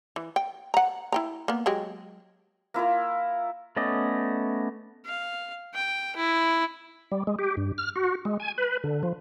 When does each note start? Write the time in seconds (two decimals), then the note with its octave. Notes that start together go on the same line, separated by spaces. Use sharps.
0.16 E3
0.36 G5
0.74 F#5 A#5
1.12 E4 G5 A#5
1.48 A#3 B3
1.66 F#3 G#3 G4
2.74 A#3 E4 F4 A#4
3.77 A3 B3 C#4 D5 D#5
5.06 F5
5.75 G5
6.16 E4
7.12 G3
7.27 G#3
7.39 G4
7.57 G2
7.78 F6
7.96 F#4
8.25 G#3
8.40 G#5
8.58 B4
8.84 D3
9.03 F3